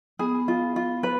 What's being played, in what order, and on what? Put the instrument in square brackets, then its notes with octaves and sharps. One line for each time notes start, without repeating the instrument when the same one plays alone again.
[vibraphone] B3 [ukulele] G#4
[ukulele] F4
F4
B4